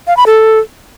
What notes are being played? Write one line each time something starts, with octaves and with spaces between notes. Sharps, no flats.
F5
B5
A4